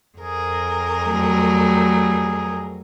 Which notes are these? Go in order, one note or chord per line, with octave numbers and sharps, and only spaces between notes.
F2 G#4 A#4
F#3 G3 A3